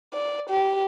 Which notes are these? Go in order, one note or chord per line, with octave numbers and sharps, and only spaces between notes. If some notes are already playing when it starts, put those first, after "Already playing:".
D5
G4